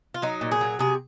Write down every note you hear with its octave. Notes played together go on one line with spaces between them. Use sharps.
F4
F#3 D#4
A#2
G#4
F#3
C3 G#4